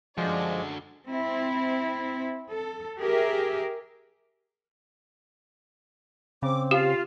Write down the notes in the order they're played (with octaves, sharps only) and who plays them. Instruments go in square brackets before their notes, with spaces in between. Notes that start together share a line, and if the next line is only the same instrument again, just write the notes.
[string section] F#2 D4 D5 [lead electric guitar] D3 F#4 [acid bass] F3 [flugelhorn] G#3
[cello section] C4 E4
A4
G4 G#4 A#4 E5
[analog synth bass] C#3 [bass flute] C4 [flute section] D6
[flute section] F4 F5 [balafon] G4